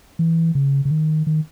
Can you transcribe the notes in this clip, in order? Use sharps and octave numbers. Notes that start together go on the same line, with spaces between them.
E3
C#3
C#3
D#3
D#3